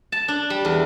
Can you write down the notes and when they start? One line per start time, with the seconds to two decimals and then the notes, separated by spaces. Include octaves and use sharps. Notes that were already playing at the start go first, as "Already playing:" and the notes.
0.12 A5
0.28 D4
0.50 G3
0.65 E2